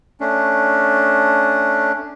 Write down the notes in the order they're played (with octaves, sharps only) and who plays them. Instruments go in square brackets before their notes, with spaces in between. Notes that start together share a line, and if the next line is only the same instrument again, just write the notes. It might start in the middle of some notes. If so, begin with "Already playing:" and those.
[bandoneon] A3 C#4 D4